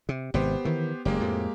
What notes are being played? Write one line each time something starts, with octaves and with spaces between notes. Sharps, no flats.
C3
G#1 C3 B3 G4 C5
D#3 E3
F#1 G#3 A#3 G4
F2 A2